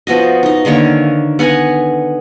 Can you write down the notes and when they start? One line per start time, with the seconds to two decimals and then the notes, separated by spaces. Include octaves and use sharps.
0.07 F3 B3 F#4 D#5
0.43 D#4 D#5
0.65 D3 D#3 A#3 C#5
1.39 B3 F#5 G#5 A#5